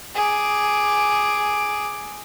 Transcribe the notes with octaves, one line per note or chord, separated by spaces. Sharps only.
G#4 D6